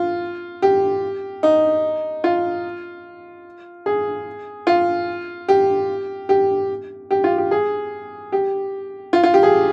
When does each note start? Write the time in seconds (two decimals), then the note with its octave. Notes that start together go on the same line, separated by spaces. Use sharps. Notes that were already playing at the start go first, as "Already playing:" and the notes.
Already playing: F4
0.62 G4
1.43 D#4
2.24 F4
3.86 G#4
4.67 F4
5.48 G4
6.29 G4
7.11 G4
7.24 F4
7.38 G4
7.51 G#4
8.32 G4
9.13 F4
9.23 F4
9.34 G4
9.43 G#4